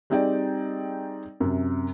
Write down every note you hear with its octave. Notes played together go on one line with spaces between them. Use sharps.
G3 C4 D#4 G#4 D5 G5
F#2 C3